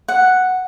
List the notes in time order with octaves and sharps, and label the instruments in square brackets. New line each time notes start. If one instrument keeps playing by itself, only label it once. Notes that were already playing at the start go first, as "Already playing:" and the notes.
[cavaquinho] F#5